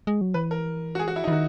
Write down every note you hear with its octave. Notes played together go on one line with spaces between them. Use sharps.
G#3
F#3
E3 B4
A#4
F#4
G#4
F#4
E4
D#4
E3
D#3 F#4